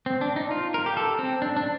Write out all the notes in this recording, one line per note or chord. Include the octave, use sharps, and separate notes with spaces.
C4
D4
D#4
F4
A#4
G4
A4
C4
D4
D4